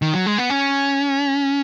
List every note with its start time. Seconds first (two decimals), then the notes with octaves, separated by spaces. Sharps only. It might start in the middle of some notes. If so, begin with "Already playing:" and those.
0.02 D#3
0.14 F#3
0.26 G#3
0.38 B3
0.50 C#4